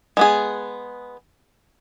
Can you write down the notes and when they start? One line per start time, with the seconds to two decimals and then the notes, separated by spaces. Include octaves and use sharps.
0.17 G#3 B3 G#4